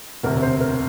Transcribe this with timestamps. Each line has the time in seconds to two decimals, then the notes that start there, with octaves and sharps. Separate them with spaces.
0.23 E1 D2 C3 A#4
0.42 C5
0.60 A#4